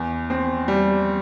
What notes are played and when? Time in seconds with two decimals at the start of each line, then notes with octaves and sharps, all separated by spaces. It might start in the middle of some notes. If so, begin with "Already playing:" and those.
Already playing: E2
0.30 C4
0.68 G3